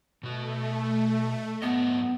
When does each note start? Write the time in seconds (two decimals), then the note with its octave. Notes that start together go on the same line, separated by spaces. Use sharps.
0.23 B2 A3 F#4
1.62 G#2 F#3 B3 D#5